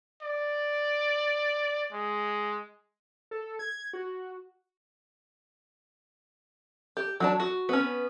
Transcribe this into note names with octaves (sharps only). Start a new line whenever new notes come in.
D5
G#3
A4
G#6
F#4
G4
F#3 D4 A5
F#4
B3 C#4